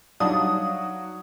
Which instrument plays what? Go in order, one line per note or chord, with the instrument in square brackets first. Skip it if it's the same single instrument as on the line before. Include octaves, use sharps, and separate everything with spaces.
[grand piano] F#3 F#4 [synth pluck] G3 D4 [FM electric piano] D#4 D5 F5 [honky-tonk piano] D#6